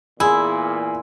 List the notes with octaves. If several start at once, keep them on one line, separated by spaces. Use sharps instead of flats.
E2 A#2 E4 G#4 G#5 C6